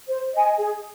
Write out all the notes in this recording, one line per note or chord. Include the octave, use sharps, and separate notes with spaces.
C5
D#5 G#5
G#4